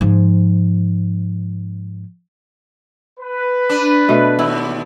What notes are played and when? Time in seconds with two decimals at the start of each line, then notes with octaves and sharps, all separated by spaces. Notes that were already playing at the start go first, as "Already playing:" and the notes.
0.01 G#2 F3
3.20 B4
3.69 D4
4.09 B2 A3
4.39 D#2 E4